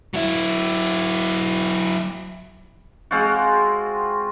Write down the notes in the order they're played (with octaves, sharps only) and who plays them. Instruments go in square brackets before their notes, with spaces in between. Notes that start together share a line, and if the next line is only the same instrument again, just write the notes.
[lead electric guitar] F#3 E4
[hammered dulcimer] G#3 C4 F4 F#4